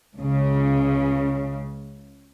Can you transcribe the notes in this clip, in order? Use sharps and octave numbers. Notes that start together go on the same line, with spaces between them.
C#2 C#3